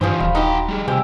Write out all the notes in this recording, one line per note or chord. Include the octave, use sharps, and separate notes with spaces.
G2 E3 F3 G3 F4 G#4 C5
D#1 F5 B5
D#4 F4 F#4 G5 A#5
G3 G#4
C3 F3 G4 G#5 E6